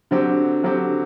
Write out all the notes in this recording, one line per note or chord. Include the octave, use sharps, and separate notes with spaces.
D3 F#3 C4 G4
D3 F#3 C4 G4